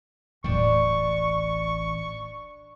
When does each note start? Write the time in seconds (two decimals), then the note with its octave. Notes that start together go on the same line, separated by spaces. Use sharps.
0.44 D#1 A1 D4 G5 C#6